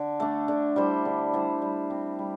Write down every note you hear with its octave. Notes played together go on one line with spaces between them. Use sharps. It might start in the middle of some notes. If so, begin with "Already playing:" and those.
Already playing: D3
A3 D4
D3
G3 E4 C5
D3
G3 E4 C5
G3
C4 G4
G3